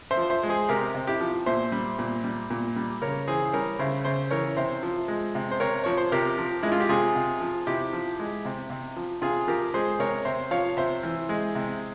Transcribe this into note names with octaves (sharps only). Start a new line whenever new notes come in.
C5 E5
F3
C5 E5
G#3
G#4 C5
C3 G4 A#4
C3
E4 G4
F3
A#2 C5 E5
G3
A#2
G3
A#2
G3
C#3 A#4 C#5
E3 G#4 C5
G3 A#4 C#5
C#3 C5 E5
C#3 C5 E5
E3 A#4 C#5
C3 C5 E5
F3
G#3
C3
C5
C3 A#4 C#5
F3 C#5
C5
C3 G4 A#4
F3
G#3 E4
F4
G4
C3 F4 G#4
C3
F3
C3 E4 G4
F3
G#3
C3
C3
F3
C3 F4 G#4
F3 G4 A#4
G#3 G#4 C5
C3 A#4 C#5
C3 C5 E5
F3 C#5 F5
C3 C5 E5
E3
G#3
C3